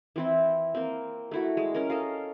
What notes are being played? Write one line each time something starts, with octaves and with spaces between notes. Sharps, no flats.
E3 C4 E4
A#3 C4
A3 E4 F#4
G#3
C#4 A#4
A4 D#5 F5